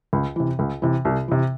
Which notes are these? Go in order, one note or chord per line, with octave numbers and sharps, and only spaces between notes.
C#2
C3 E3
C#2
C3 E3
C2
C3 E3